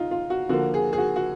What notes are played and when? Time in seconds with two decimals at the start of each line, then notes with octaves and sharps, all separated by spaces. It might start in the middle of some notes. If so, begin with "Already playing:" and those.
Already playing: D#4 F4
0.11 F4
0.30 F#4
0.49 D3 F3 A#3 F#4
0.74 G#4
0.93 G#4
0.98 F#4
1.16 F#4